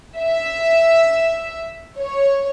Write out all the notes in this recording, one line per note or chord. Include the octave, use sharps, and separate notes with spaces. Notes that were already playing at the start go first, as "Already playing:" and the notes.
E5
C#5